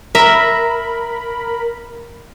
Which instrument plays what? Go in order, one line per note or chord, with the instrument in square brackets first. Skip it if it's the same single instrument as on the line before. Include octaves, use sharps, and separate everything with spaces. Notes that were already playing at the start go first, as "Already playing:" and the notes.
[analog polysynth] A#4 B5 [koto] E5 [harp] A#5